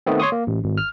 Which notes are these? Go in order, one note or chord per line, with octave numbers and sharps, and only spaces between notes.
D#3 A3 B3 C4
C#5 C6 C#6 D#6
A#3
A1
G#1
F6